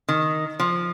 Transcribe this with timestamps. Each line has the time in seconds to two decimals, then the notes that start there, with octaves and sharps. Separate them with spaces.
0.08 D#3
0.60 F3